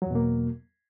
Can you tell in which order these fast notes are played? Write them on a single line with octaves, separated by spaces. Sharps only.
F#3 E2 B2 A#3